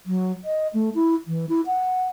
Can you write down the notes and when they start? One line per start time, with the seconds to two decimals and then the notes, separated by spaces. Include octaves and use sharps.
0.06 F#3
0.45 D#5
0.74 A3
0.95 E4
1.27 E3
1.49 E4
1.66 F#5